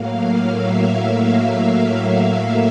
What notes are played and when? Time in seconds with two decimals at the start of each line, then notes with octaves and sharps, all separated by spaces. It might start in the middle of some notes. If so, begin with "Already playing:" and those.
Already playing: A2 F#3 A#3 F5
0.15 F5
0.45 E5